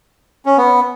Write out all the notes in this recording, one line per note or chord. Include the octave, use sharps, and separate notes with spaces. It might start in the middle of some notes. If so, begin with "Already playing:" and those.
C#4
B3